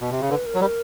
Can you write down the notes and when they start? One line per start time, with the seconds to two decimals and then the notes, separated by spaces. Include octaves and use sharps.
0.01 B2
0.11 C3
0.21 C#3
0.30 D3 B4
0.46 A#4
0.54 F#3
0.61 G3 A#4